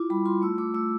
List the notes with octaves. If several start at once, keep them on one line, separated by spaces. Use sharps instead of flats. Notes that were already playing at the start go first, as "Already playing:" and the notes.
Already playing: E4 F4 D6
G3 B5
F4 C6
A3 E6
A3 D6
A3 E6